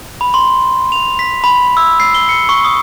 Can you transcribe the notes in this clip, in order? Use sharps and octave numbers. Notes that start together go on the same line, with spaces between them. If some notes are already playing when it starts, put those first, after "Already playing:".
B5
C6
F7
B6
B5
E6
C7
G7
C#7
C#6
D#6